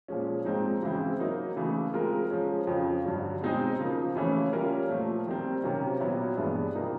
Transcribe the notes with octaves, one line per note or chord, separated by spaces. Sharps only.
A#2 F3 G#3 C#4
G#2 F3 G#3 C4 D#4
C#3 E3 G#3 C4 E4
F#3 A#3 D#4
C#3 E3 A3
G#3 C4 F4 A#4
F3 G#3 C#4
F2 C#3 F3
G2 D3 F#3
B2 G#3 C4 D#4 G#4
C#3 F3 A#3
C#3 E3 A3 C#4
G3 A#3 C#4 F4 A#4
A#2 F3 A3
D#3 G3 C4
C3 D#3 F#3 A#3 C#4
A#2 F#3 B3 E4
G2 E3 G#3 B3 D4
C3 F3 A#3 D#4